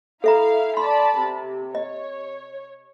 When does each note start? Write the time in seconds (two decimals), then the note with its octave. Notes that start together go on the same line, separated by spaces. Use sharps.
0.24 E4 A4 E5 F5 A#5
0.77 D5 A5 B5 C6
1.18 C3
1.75 C#5 D#5